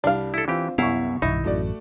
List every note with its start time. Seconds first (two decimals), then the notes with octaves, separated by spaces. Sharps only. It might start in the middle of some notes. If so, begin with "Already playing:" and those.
0.04 C2 G3 D4 F5
0.34 E4 A4
0.48 E3 C4 F4 G4
0.78 C2 F#2 B3 E4 F5 C#6
1.22 B1 G2 D#3 D#4 E4
1.44 A1 F#2 A3 F#4 D5